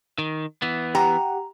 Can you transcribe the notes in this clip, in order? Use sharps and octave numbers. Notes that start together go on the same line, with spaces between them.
D#3
E3 B3
G4 F#5 A#5